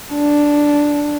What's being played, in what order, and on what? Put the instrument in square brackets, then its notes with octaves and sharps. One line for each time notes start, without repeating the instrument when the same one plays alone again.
[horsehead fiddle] D4